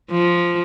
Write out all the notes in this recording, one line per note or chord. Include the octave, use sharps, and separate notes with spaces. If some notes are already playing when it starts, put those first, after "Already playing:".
F3